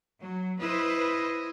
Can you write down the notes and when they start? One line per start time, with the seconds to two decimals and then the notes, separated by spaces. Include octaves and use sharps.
0.20 F#3
0.61 E4 B4 C5 D#5